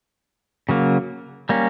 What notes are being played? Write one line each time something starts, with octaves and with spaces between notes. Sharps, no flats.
C#3 F#3 A#3
G3 A#3 C#4